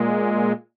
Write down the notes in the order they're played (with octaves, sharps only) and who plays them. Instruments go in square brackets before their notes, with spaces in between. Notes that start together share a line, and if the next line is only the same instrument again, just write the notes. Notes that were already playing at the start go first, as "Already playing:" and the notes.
Already playing: [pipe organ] A#2 G#3